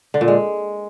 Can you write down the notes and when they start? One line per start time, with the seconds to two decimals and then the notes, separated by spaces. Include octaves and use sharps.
0.14 D3
0.21 A#2
0.28 G#3